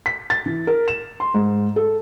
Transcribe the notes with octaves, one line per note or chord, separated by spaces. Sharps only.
B6
A6
E3
A#4
E7
C6
G#2
A4